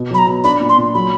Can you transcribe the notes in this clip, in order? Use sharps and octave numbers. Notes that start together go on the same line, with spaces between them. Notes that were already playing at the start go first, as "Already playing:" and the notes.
Already playing: B2
F#3 B5
A#5
B2
D4 B5
A#2
C6
A#2
F#3 B5